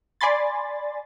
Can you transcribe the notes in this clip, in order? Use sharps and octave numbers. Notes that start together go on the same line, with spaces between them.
D5 G#5 B5 C6 A6